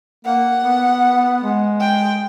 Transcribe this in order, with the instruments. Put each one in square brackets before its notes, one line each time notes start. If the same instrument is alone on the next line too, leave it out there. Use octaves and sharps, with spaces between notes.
[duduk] A#3 [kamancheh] F#5
[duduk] B3
G#3
[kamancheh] G5